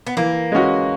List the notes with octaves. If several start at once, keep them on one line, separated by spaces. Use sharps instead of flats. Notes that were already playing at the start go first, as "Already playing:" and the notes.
B3
E3 A#3
G#3 C#4 F#4